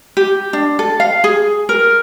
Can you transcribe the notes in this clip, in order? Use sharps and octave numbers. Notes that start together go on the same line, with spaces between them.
G4
D4
A4
F5
G#4
A#4